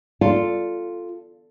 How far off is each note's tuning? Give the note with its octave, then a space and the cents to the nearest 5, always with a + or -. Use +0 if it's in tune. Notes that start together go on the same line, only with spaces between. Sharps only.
F4 +0 A4 +0 D5 +0